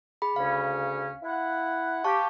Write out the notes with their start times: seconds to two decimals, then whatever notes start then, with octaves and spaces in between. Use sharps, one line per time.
0.22 G#4 B5
0.36 D2 C#3 C#4 F5
1.23 E4 F#5
2.04 G4 F5 A5 C#6